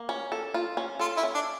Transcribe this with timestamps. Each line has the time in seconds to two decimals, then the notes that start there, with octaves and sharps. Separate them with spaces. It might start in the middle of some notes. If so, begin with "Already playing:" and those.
Already playing: A#3
0.09 C#4
0.32 A4
0.54 F4
0.77 C#4
0.99 F4 A4
1.17 E4
1.23 C#4
1.35 D4